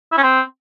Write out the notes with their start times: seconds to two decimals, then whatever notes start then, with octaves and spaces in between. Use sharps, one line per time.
0.12 E4
0.17 C#4
0.23 C4